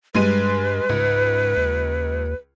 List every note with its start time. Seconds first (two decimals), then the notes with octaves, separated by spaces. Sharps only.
0.15 G2 G3 G#3 B4 D#7
0.89 C#2 G#2
1.57 D#2